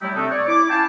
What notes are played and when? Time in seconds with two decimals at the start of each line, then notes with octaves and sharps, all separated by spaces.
0.01 F#3 G3 A3 D#4 E4 G4
0.15 C3 A3 C4 D4 D#4 A4
0.31 C#5 D5
0.47 E4 D6
0.69 C#4 E4 F5 G5 A5